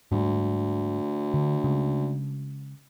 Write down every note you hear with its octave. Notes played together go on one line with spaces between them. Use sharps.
D2 G#2 G3
D3
C#3 G#3